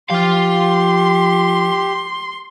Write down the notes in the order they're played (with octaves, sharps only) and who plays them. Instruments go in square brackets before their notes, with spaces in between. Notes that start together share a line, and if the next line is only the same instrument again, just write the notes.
[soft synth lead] F3 [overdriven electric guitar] F4 F5 [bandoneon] G4 [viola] C6